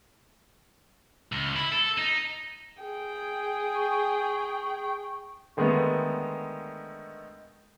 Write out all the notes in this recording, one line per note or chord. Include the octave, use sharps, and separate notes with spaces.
C#2
E4
A4
D#4
G#4 G5
C#6
D3 D#3 G#3 A3 B3